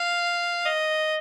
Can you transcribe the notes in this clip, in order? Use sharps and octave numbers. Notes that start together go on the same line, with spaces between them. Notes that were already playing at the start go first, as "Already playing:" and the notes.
Already playing: F5
D#5